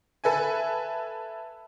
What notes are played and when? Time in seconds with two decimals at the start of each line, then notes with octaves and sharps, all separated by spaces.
0.24 A4 B4 E5 G#5